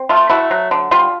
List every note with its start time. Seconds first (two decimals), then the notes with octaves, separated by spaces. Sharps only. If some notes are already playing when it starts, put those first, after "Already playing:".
Already playing: C4
0.09 A3 F4
0.29 A3 E4 F#4
0.51 F#3
0.71 D3
0.91 G3 F4